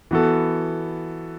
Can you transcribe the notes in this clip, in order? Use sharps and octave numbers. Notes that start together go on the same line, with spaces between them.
E3 B3 F#4 A4